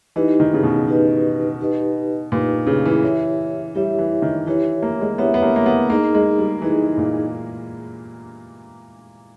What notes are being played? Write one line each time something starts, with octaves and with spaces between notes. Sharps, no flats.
E3 D#4 G4 B4 D#5
D#3
C#3
B2
D#4 G4 B4 D#5
D#4 G4 B4 D#5
A#2 D#4 G4 B4 D#5
C#3
E3
E4 G4 C#5 E5
G3 E4 G4 C#5 E5
E3
D#3
E3 E4 G4 C#5 E5
A#3
G#3
B3 E4 G4 C#5 E5
B3
A#3
A#3
B3
A#3 D#4 G#4 D#5
G#3
G3
E3 D#4 G#4 D#5
A#2